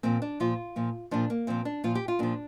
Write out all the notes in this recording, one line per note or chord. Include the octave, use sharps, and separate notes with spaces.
A#2 F3 C4
D4
A#2 F3 F4
A#2 F3
A#2 F3 D4
A#3
A#2 F3 C4
D4
A#2 F3 F4
G4
F4
A#2 F3 D4